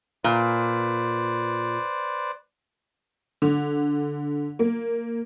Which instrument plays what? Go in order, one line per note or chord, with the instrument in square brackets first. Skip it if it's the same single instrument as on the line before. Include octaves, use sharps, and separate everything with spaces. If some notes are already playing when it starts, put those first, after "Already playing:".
[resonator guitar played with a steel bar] A#2 [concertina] B4 C5 D5
[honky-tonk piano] D3
A#3